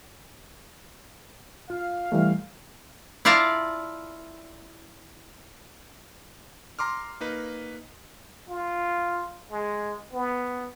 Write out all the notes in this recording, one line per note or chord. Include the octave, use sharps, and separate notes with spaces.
F4 F5
E3 G3 A3
E4 F4 D5 F5 A5 A#5
A#5 C6 D6 F6
A#3 D#4 B4
F4
G#3
B3